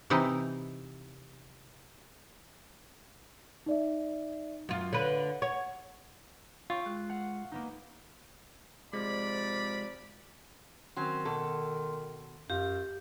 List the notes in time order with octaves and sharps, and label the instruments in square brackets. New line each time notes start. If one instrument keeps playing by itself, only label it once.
[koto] C3 E3 D#4 E4 D#5
[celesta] D#4 D5 E5
[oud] F#2 F4
[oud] D3 B4 [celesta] C#5
[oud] C#5 [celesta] F#5
[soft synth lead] C#4 [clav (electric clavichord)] F4 [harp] G5 C#6 E6
[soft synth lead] G#3 [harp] F#6
[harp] F5 F#5
A#3 B3 D#4
[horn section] C3 F3 D5 [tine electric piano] G#3 [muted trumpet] B5
[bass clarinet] D#3 [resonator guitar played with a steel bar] F#3 C4 C#4 [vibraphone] C6
[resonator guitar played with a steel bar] B2 A4
[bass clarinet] F#2 [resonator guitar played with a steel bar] F4 [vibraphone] G4